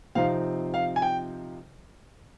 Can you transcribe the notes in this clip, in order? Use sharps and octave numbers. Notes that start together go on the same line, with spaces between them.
C3 F3 C4 D#4 F5
F5
G#5
G5